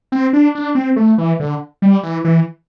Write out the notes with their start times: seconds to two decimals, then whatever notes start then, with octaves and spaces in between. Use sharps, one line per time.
0.12 C4
0.33 D4
0.55 D4
0.75 C4
0.96 A3
1.18 E3
1.40 D3
1.82 G3
2.03 E3
2.25 E3